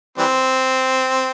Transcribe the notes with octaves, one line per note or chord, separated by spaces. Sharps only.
E3 G3 C4